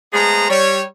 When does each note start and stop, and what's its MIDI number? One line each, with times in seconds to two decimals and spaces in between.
0.13 0.48 56
0.13 0.48 57
0.13 0.48 59
0.13 0.48 68
0.13 0.48 72
0.13 0.48 82
0.49 0.82 55
0.49 0.82 73